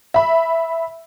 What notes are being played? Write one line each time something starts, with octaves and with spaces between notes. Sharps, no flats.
E5 B5